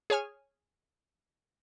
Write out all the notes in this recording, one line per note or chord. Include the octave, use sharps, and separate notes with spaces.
G#4 C#5 G#5 F6